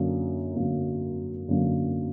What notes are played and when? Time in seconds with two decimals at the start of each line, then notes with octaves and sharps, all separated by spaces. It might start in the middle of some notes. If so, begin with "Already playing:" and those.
Already playing: F#2 D3 F#3 A#3
0.55 F#2 D3 F#3 A#3
1.48 F#2 D3 F#3 A#3